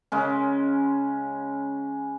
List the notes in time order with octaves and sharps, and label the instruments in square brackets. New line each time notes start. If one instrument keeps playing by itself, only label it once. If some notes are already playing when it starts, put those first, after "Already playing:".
[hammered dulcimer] C#3 G#3 C#4